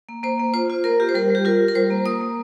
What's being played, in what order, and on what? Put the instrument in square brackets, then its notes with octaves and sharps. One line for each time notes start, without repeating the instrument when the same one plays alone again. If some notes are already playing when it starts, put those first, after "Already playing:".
[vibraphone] A#3
A#3 C5
A#3
F4 C5
F4
A#3 A#4
F4 G4
C5
G3 A#4
G3 G4
F4 A#4
F4
A#4
G3 C5
A#3
A#3 D#6
A#3